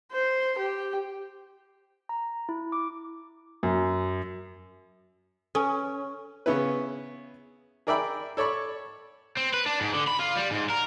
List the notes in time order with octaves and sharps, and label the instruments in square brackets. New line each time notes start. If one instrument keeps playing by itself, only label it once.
[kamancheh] C5
G4
[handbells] A#5
E4
D6
[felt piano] F#2
[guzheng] C#4 [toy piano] A4 B4 G#5
[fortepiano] C#3 B3 C#4 E4 B4
G#4 A#4 D5 E5 G5 B5
A4 C#5 D5 B5 C#6
[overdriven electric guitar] C4
B4
D4
G#2
D3
B5
F4
G3
G#2
A#4